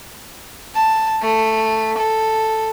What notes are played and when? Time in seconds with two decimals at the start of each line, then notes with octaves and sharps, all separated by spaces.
0.75 A5
1.22 A3
1.97 A4